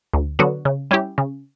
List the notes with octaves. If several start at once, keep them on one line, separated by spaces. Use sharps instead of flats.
D2
D3 F#3 B3 F#4
C#3
G3 C#4 E4 G4
C#3